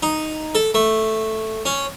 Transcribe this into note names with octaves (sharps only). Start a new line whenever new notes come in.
D#4
A4
A3
C#4